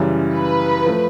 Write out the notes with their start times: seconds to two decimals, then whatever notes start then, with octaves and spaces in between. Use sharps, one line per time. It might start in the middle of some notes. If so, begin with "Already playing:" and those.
Already playing: F#2 C#3 E3 G3
0.33 B4
0.86 F3 A3